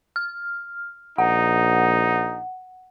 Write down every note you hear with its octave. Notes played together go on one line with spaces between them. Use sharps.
F6
A#1 D#4 F#5